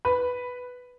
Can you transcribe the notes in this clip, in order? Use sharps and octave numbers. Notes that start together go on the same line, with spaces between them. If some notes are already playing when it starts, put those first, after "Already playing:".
B4 B5